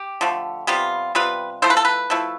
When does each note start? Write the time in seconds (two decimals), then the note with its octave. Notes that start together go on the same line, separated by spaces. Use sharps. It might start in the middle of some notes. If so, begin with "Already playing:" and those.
Already playing: G4
0.21 D3 F3 A3
0.67 C3 G3 B3 F4
1.15 C3 G3 B3 F4 B4
1.62 F3 A3 E4 C5
1.70 B4
1.77 A4
1.85 B4
2.10 F3 A3 E4